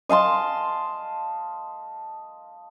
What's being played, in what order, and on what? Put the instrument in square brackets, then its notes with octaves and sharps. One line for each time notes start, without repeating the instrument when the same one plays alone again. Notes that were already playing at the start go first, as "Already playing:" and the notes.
[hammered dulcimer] D#5 F5 A5 C6